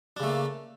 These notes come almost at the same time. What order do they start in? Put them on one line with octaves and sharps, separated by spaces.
D4 C#3 A3 A#3